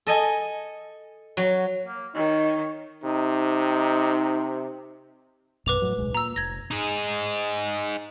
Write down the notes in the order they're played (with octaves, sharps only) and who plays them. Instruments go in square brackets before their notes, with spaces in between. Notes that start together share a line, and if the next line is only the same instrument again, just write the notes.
[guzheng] A4 D#5 G#5
F#3
[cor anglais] A#3
[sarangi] D#3 [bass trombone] D#4 [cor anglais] C#5
[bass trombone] C3 [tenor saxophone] D#4
[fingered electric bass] A#1 F#2 B2 [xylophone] B4 D6 F7
[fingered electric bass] F2 A2 F#3
D1 B1 G#3
[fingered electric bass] A#2 [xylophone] A#5 E6
[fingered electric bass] F1 [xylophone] G#6 A#6
[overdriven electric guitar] D#4 G#4